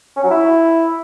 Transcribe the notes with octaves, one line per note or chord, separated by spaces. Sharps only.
C#4
F#3
E4